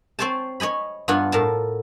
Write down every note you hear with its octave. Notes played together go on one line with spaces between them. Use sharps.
C4 C5 C#5 G#5 A5
C#5 D#5 G#5 B5
G2 B3 F4 F#5 G#5
A2 A#4 A5